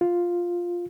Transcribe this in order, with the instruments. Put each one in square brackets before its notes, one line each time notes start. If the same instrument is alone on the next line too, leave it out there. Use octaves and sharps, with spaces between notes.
[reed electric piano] F4